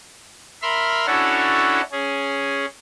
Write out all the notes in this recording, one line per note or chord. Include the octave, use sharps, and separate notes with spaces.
A#4 E5 B5 C6 F6
C#4 D4 E4 F#4 A4 C#5
C#4 G#4